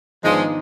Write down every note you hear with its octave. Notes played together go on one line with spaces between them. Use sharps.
G#2 D#3 F3 G#3 B3 D4